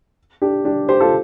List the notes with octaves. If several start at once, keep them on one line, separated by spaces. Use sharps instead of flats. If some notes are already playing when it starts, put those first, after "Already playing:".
D4 G4
D4 G4
G4 C5
F4 A4